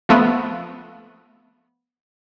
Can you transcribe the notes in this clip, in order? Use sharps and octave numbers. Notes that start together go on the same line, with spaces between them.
F3 A3 B3